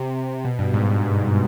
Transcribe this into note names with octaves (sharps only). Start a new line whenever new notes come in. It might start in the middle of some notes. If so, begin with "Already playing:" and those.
Already playing: C3
B2
G2
G#2